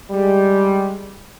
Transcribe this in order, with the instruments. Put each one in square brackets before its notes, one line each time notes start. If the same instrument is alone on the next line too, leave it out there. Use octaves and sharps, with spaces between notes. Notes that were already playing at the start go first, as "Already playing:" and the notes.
[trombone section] G3 G#3